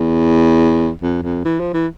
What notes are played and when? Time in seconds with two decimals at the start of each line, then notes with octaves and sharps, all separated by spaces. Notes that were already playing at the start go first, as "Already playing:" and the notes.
Already playing: E2
1.02 F2
1.23 F2
1.45 E3
1.60 F3
1.74 E3